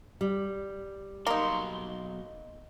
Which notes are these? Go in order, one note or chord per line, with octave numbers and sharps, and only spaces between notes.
G3
B1 A#3 D#4 C6